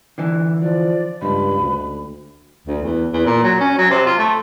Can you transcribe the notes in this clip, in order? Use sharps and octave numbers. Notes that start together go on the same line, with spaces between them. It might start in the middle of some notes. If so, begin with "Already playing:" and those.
D3 E3
F3 D5
C#2 G2 B5
D2
D2
E2
E2
A#2
F#3
C#4
F#3
C3
F4
A3